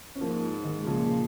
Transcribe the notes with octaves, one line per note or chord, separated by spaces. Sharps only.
C#4
G#2 F3 A#3
D#3 G#3
A#2 C#3 F3